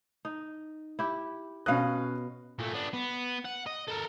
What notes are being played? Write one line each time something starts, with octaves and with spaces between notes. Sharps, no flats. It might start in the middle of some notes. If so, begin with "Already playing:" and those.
D#4
E4 G4
B2 C#4 D#5 F5 F#6
A#2 A3
B3 D4
B3
F#5
D#5
A4 A#4